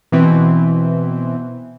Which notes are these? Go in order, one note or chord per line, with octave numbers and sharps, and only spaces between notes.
B2 E3 C4